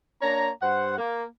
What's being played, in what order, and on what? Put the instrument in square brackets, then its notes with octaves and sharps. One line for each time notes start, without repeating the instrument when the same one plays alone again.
[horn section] A#3 D4 C#5 A#5
G2 C5 F#5
A#3